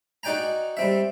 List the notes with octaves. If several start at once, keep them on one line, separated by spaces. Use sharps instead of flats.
D#4 F#4 D5 G5 G#5 A#5
G3 C4 E5